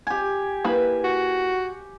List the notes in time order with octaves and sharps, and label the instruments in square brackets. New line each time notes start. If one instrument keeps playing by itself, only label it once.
[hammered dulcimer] G4 G#5
[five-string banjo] A#3 E4 B4
[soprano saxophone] F#4